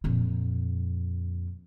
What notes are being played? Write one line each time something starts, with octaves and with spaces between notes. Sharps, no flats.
F2 A#2